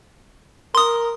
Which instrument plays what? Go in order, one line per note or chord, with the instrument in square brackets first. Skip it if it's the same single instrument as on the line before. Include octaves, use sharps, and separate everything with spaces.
[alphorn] A#4 [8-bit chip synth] C6 D#6